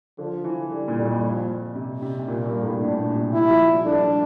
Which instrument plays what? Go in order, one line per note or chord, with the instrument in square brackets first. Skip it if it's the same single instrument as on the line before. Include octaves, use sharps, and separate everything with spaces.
[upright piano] D3 [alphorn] F3
[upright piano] E3
[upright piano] D3 [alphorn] G3
[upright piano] A#2
F2
G2
[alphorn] F3
[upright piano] C3
C3
C3
[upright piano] A#2 [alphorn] A#3
[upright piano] G2
A2
[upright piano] A#2 [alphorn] D4
[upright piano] A#2
C3
[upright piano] E3 [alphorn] E4
[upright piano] F3
G3
[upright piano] A3 [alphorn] D4
[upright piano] G3